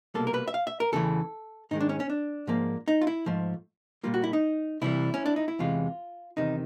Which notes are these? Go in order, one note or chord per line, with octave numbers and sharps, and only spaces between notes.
C2 B2 G3 A#3 A4
A#4
B4
E5
F5
E5
A#4
E2 C#3 E3 A3 A4
G#2 D#3 G#3 D#4
D4
C#4
C#4
D4
G#2 F3 A#3
D#4
F4
E4
G#2 F3 A3
A#2 G3 A#3 F4
F#4
E4
D#4
C2 C3 E3 G3 E4
C#4
D4
D#4
E4
E2 C3 E3 G#3 F4
E2 C3 D#3 D#4